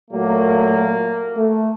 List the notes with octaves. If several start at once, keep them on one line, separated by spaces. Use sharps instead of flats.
A#2 F#3 A3 A#3
A3